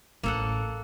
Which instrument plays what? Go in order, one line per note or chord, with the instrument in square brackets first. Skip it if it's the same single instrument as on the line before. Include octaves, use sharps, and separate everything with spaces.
[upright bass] A1 [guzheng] A#3 A4 F#5